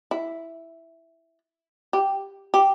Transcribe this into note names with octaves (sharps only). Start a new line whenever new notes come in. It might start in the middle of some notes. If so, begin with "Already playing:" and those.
E4
G4
G4